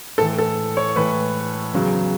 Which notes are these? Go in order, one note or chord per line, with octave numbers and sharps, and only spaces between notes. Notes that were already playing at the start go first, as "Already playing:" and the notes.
A2 E3 A4
A4
C#5
A2 E3 B4
E2 C#3 F#3